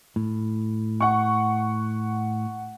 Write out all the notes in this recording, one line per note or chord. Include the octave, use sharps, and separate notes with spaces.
A2
F#5 C#6